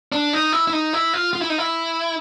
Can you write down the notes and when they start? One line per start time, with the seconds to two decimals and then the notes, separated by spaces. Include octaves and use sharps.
0.12 D4
0.33 D#4
0.53 E4
0.68 E4
0.73 D#4
0.93 E4
1.13 F4
1.33 F4
1.41 E4
1.50 D#4
1.58 E4